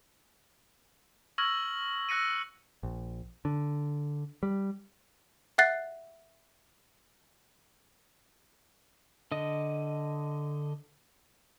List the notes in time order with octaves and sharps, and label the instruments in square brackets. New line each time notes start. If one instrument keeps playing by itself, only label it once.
[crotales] C#6 E6 F6 G#6 A#6 F#7
E6 F#6 A#6 C#7 D#7
[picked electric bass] A#1
D3
G3
[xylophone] E5 F#5 F#6 A6 C7
[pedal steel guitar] D3 D#5